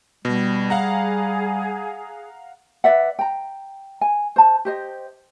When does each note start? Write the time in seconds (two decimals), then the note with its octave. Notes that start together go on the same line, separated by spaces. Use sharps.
0.25 B2 G3
0.70 G#4 F5 F#5 A#5
2.84 B4 D5 E5 F#5
3.19 G5 A#5
4.01 G#5
4.36 C5 A5
4.65 G4 C5 D#5